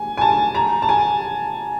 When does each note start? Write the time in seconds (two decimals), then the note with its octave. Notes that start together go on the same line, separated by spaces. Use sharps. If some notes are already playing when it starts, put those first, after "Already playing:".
Already playing: G#5
0.17 G#5
0.21 A5
0.55 A#5
0.82 A5
0.89 G#5